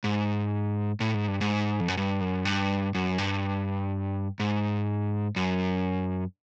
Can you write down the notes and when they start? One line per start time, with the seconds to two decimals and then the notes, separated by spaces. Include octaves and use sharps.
0.04 G#2
1.00 A2
1.14 G#2
1.28 G2
1.41 G#2
1.80 F2
1.88 F#2
1.97 G2
2.21 F#2
2.45 G2
2.95 F#2
3.18 G2
4.40 G#2
5.36 F#2